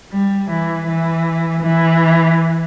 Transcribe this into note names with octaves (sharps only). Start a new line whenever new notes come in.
G3
E3
E3
E3